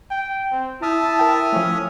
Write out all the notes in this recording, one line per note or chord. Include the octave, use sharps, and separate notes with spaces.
G5
C4
E4 E5 A5 D#6 F6
A#4 G5
F3 A3 C#4